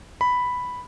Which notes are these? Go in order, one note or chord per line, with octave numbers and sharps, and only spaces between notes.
B5